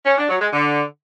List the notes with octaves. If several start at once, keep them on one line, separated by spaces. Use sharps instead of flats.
C#4
D4
F#3
G#3
D3